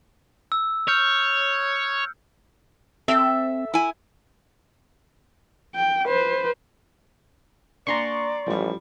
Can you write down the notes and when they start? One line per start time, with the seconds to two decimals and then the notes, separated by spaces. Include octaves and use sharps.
0.52 E6
0.88 C#5 F6 G6 C#7
3.08 C4 A4 E5
3.74 E4 G#5
5.75 G5
6.06 B4 C5
7.87 A#3 D4 D5 G#5 A#5 C6 C#6
8.47 A1 F3 G3